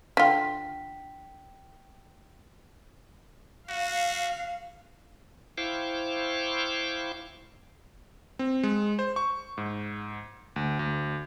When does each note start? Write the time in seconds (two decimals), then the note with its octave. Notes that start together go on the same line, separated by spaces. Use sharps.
0.17 D3 F4 G5 B6
3.69 F#4 F5
5.58 E4 C5 F5 G5 C#6 D6
8.39 C4
8.63 G#3
8.99 C5
9.16 C#6
9.58 G#2
10.56 D2
10.79 D2